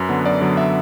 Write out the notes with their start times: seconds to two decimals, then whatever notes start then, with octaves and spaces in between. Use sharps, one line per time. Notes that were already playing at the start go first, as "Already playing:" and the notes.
Already playing: F#2 B4
0.09 D3 F#3 B3
0.25 F#2 D5
0.41 D3 F#3 B3
0.57 E5